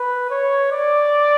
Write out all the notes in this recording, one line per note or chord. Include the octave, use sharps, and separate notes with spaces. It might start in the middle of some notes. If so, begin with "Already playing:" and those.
Already playing: B4
C#5
D5